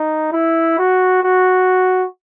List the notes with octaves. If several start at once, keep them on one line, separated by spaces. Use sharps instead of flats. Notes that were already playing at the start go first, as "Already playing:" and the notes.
Already playing: D#4
E4
F#4
F#4